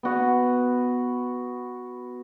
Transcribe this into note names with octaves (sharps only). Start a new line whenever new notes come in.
B3 F#4